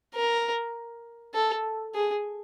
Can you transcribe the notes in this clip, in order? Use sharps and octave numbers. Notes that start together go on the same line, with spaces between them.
A#4
A4
G#4